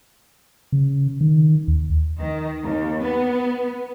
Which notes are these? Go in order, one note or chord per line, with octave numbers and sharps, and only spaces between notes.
C#3
D#3
D#2
D#3
D#2
B3